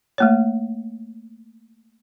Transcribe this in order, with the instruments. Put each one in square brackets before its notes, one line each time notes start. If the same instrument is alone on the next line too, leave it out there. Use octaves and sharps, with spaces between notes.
[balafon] A3 A#3 C#5